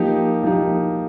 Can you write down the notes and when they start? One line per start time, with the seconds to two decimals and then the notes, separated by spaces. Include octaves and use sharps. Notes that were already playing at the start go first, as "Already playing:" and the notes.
Already playing: F3 A#3 D#4 G4
0.43 F3 A#3 D#4 G4